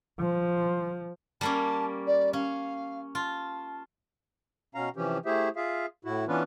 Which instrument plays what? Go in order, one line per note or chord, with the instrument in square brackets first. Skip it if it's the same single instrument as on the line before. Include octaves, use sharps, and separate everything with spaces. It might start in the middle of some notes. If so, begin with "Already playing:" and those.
[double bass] F3
[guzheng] G3 A#3 C#4 [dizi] A5
[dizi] D5
[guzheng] C#4 [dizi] F5
[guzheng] F4 [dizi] A5
[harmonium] B2 C#4 F5 A#5
C3 E3 F3 C#4 G4
A3 E4 G4 G#4 C5 E5
F4 G#4 E5 F5
A2 E4 F#4
E3 B3 C#4 D4 F4 B4